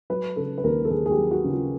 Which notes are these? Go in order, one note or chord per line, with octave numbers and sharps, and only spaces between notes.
F#3 B4
C#3 A4
B4
D#2 A#4
A4
D#2 G#4
G#4
G4
F#3
F#4
C#3
F4